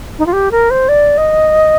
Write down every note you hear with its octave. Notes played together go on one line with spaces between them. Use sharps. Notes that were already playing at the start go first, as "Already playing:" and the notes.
D#4
F4
G4
A#4
C5
D5
D#5